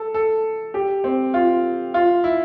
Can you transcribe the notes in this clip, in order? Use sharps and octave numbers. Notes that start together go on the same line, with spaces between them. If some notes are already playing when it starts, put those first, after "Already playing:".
Already playing: A4
A4
G4
C4
F4
F4
E4